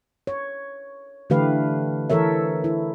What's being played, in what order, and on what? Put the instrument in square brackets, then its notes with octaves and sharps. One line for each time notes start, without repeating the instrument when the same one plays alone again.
[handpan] C#5
D3 E3 A3 G4 B4 F5
E3 A4 A#4 C#5 E5
E4